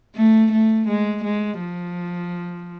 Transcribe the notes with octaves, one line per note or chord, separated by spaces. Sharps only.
A3
A3
G#3
G#3
F3